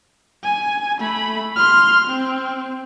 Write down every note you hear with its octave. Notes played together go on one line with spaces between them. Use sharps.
G#5
A3 B5
C6 F6
C4